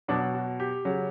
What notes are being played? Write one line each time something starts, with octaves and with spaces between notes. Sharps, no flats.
B2 F#3 D4
F#4
G4
C#3 F#3